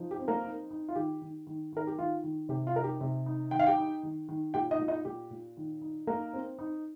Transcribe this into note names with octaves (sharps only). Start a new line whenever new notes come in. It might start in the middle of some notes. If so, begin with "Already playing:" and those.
Already playing: F3 D#4
G4
C4
A#3 A#4
D#4
D#4
F4
D#3 G4
D#3
D#3
D#3 A#4
G4
D#3 F4
D#3
C3 G4
F4
D#4 A#4
G4
C3
D#4
D#3 G5
F5
G4 G5
D#4
D#3
D#3
A#2 G4 G5
D#4 D#5
A#2
D#4 D#5
A#2 G4
A#2
D#3
D#4
A#3 D#4 A#4
C4
D#4